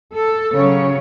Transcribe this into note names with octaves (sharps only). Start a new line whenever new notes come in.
A4
C#3 F#3 C#4 C#5